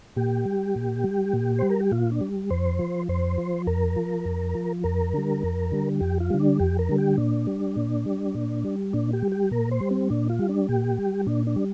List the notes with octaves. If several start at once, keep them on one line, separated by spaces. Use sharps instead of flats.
A#2 G4
G3
A#2
G3
A#2
G3 C5
A#4
G4
A#2 F4
D4
G3
F2 C5
F3
F2 C5
F3
F2 A#4
F3
F2
F3
F2 A#4
D3 G3
F2
D3 G3
F2 G4
F4
D3 G3
D4
F2 G4
A#4
D3 G3
G4
A#2 D4
G3
A#2
G3
A#2
G3
A#2 D4
G4
G3
G4
A#2 A#4
C5
G3
C4
A#2 D4
F4
G3
D4
A#2 G4
G3
A#2 D4
D4
G3